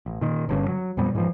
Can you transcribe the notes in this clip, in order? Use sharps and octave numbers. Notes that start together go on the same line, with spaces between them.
A1
A#2 D#3
G1 G2 C#3
F#3
F2 A#2 G3 B3
G#2 E3 F3